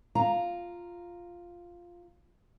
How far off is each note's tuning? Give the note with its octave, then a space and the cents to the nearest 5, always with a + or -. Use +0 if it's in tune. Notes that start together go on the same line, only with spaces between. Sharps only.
F4 +0 A#5 +0